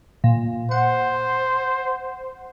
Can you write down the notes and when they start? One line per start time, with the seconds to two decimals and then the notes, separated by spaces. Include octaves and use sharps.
0.24 A#2
0.71 C5 F#5